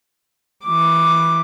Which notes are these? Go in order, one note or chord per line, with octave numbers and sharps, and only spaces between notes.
E3 D6